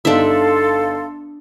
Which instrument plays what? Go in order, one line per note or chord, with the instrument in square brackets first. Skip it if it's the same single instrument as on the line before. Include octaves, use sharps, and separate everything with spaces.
[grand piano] G1 D3 D#4 [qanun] D4 E5 [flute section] A4 F5 C6